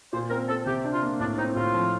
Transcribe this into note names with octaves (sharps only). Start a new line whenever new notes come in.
A#2 C5
C4 A#4
C4 A4
C3 G4
D4
F4
A#3
A2 D4
C4 D#4
A2 F4
F3